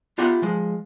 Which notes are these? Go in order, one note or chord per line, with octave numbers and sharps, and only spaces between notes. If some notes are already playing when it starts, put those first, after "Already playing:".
B3 F4 G4 E5 F#5 A#5
F3 G#3